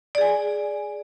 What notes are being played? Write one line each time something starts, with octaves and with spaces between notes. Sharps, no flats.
G#4 D5 G#5